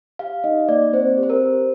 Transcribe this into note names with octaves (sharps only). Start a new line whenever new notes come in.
G4 F5
D#4 D#5
A#3 D5
C4 C5
G4
C5
A#4
G4